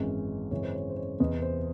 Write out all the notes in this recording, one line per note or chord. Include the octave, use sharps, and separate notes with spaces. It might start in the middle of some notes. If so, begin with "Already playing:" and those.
Already playing: G#1 F#2 E3 G#3 C#4
G#1 F#2 C#3 E3 G#3 C#5
C5
C#5
C5
C#5
E2 C3 E3 D#5
C5